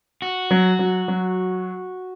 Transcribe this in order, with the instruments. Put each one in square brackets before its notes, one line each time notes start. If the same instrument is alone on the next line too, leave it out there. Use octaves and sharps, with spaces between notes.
[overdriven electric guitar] F#4
[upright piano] F#3
F#3
F#3